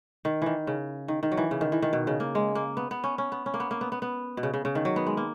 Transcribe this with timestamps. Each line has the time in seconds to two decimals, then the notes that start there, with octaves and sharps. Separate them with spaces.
0.25 D#3
0.42 D#3 E3
0.67 C#3
1.08 D#3
1.23 D#3
1.32 F#3
1.37 E3
1.51 C#3
1.61 D#3
1.72 E3
1.82 D#3
1.93 B2
2.07 C#3
2.20 A#3
2.35 G#3
2.55 A#3
2.77 B3
2.91 B3
3.04 C#4
3.18 C#4
3.32 B3
3.46 C#4
3.54 A#3
3.60 B3
3.71 A#3
3.81 B3
3.92 B3
4.02 B3
4.37 B2
4.43 C#3
4.54 C#3
4.65 C#3
4.75 D#3
4.85 F#3
4.96 B3
5.06 G#3
5.17 A#3